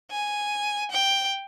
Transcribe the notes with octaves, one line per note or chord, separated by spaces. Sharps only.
G#5
G5